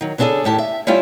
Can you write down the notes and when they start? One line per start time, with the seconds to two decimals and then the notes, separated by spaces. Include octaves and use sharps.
0.01 D#3 F#3
0.18 C#3 B3 D4 D#4 G#4 A4
0.44 D#2 A2 G4 A5
0.58 E5
0.87 G3 C#4 E4 F4 G4